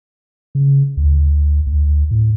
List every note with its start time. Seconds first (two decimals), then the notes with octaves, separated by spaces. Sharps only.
0.55 C#3
0.97 D2
1.67 D2
2.11 A2